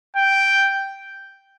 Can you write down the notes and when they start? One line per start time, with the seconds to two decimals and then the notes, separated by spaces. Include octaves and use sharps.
0.16 G5